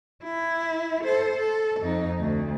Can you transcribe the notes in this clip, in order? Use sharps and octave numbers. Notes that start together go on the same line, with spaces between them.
E4
A4 C5
A4
F2 D#4
D2